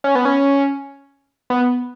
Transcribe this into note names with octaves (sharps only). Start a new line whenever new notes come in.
C#4
B3
C#4
B3